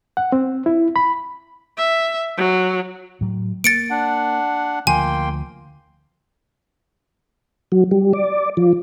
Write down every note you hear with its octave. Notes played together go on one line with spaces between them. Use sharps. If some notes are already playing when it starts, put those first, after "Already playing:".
F#5
C4
E4
B5
E5
F#3
A2 F#3 A3
A#3 A6 C#7 D7
D4 F#5
D2 F3 A#3 G5 G#5 C6
F#3
G3
D5
F3